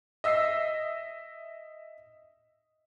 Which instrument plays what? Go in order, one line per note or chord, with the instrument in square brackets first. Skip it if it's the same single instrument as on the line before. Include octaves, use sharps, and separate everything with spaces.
[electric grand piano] D#5 E5 E6 A#6 C7